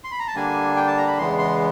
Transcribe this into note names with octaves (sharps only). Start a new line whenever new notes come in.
C6
B5
A#5
A5
D3 G3 A#3 D4 G#5
G5
A5
A#5
B5
E2 C#3 E3 G#3 B3 C6
C6